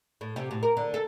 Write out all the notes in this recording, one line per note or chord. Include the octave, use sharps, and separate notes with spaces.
A2
C3
A2
A#4
D3
A4